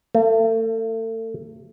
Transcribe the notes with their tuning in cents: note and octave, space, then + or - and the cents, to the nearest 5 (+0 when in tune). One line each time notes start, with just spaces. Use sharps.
A3 +35